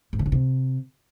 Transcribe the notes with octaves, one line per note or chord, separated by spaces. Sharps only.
G#2
C3
C#3
C3